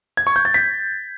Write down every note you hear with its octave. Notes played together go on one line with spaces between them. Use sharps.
G#6
C#6
G6
A6
B6